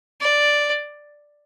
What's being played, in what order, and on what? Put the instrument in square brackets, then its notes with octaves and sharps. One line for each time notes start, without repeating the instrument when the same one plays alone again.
[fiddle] D5